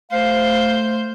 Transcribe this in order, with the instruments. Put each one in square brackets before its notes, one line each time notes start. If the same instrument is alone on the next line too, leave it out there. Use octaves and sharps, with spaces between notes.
[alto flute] A3 [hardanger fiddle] C5 [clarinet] F5